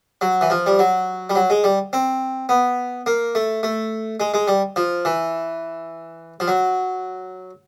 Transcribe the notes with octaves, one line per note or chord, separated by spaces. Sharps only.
F#3
E3
F3
G3
F#3
G3
F#3
G#3
G3
C4
B3
A#3
A3
A3
G#3
G#3
G3
F3
E3
F3
F#3